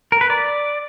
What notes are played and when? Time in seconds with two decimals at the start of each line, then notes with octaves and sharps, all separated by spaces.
0.12 A#4
0.21 B4
0.30 D5